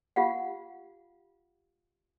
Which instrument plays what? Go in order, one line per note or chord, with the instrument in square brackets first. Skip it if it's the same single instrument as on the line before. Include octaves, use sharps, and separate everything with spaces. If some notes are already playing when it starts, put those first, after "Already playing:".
[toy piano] F4 G4 F5 F#5